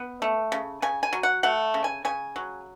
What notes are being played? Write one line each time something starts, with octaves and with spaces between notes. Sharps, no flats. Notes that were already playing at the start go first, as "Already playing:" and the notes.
Already playing: B3
A3
C#3
C#3 G#5
G#5
F#3
F#5
A3 F#5
C#3
G#5
C#3 G#5
F#3